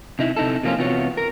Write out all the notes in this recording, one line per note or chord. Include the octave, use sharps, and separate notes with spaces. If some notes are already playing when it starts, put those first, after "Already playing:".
C3 D#4 E4
C3 D#4 E4 A4
C3 F3 A#3 C#4 F4
E2 C3 B3 F4 F#4 C#5
A#4